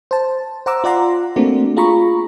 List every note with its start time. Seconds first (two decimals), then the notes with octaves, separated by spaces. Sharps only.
0.11 C5 A5
0.66 C5 F#5 A#5 D6 E6
0.84 F4 D5 F#5 A#5 C6
1.36 A3 A#3 C4 D4 F#4 D5
1.77 F4 G#4 A#5 B5 C#6